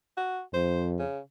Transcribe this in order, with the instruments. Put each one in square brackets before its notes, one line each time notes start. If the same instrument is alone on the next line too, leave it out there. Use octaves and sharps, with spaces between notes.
[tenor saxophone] F#4
[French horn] F2 [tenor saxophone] C5
[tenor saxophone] C#3